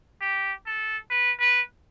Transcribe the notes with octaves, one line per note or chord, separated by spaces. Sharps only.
G4
A4
B4
B4